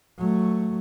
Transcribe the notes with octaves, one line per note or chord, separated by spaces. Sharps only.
F#3 A3